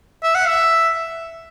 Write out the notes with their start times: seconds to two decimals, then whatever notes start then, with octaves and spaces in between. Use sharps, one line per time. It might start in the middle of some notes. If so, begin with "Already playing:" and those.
0.23 E5
0.35 F#5
0.48 E5